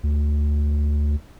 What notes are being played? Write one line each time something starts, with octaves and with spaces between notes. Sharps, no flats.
D2